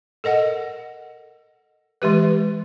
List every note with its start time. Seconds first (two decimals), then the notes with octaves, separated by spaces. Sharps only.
0.24 A4 A#4 D#5 F#5
2.02 E3 G#3 G4 B4